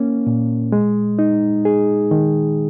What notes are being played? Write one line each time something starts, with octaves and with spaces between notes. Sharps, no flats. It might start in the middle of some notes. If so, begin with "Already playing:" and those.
Already playing: A#3 C#4
A#2
G#3
D#4
G#4
D#3